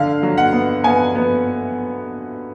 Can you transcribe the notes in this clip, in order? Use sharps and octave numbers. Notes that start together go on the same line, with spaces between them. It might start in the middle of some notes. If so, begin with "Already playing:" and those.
Already playing: D3 F5
F#3
F#5
B3
B3 G#5
B3